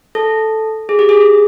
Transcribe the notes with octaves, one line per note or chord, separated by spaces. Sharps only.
A4
G#4
G4
G#4